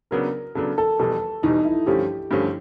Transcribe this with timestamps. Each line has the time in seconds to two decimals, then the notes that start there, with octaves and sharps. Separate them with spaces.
0.11 C#3 F#3 B3 D4 A#4
0.55 C#3 F#3 B3 D4 A4
0.78 A4
0.99 F1 E2 B2 G3 A4
1.42 F1 E2 B2 G3 D#4
1.64 E4
1.86 G2 D3 F3 A3 C#4 G4
2.31 G2 D3 F3 A3 C#4 G4